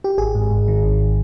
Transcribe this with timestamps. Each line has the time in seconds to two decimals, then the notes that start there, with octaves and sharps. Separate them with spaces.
0.04 G4
0.18 G#1 G#4
0.35 G#2
0.51 G#1
0.68 D#3
0.84 G#1